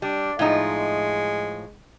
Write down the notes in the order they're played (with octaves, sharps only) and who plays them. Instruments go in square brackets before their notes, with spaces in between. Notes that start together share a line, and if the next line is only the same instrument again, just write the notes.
[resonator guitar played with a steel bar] G3 [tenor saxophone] D4
[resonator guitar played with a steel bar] A2 F3 D#4 [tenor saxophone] G#3